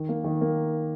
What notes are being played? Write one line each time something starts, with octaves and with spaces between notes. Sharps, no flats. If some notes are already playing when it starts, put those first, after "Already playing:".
Already playing: D#3
A#3
D#3
A#3